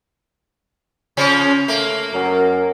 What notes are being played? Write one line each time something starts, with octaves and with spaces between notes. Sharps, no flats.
C#3 F3 C#4
A3 A#3
F#2 A#4